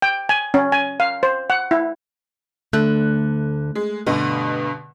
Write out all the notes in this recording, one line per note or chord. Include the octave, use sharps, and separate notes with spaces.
G5
G#5
C#4
G#5
F5
C5
F#5
E4
D2 D3 A3 F#6
G#3
G2 B2 D3 B4 D#5